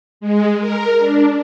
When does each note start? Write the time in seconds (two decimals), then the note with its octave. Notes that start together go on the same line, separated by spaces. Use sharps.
0.21 G#3
0.60 A#4
0.99 D4